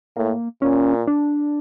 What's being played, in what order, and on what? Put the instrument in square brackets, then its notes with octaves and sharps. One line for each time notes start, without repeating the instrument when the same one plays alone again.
[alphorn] A2 [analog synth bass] A#3
[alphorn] A#2 [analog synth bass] C#4
[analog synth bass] D4